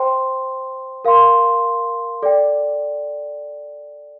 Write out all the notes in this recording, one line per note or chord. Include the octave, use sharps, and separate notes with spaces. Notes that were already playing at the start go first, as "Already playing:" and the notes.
Already playing: C5 G5 C6
A#4 F5 C6
A4 D5 G5